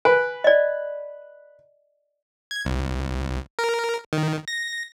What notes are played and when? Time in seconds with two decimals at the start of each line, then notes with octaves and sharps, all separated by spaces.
0.05 B4 G#5
0.44 D5 D#5
2.51 G#6
2.65 C2
3.59 A#4
4.13 D#3
4.48 A#6